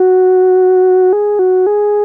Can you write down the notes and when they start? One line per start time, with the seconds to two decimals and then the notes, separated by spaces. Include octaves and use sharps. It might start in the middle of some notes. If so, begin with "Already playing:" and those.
Already playing: F#4
1.13 G#4
1.39 F#4
1.67 G#4